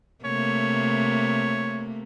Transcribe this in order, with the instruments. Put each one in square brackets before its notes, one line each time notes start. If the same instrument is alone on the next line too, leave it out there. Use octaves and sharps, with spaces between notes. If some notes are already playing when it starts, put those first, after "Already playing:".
[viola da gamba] C3 A3 A#3 [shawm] C#5